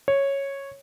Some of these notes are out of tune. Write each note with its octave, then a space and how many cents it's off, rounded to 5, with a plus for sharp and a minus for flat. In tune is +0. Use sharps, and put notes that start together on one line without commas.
C#5 -5